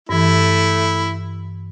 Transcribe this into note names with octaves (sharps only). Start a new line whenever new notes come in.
G2 E3 A3 E4